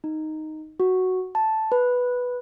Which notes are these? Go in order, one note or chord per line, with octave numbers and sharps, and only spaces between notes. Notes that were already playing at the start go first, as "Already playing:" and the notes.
D#4
F#4
A5
B4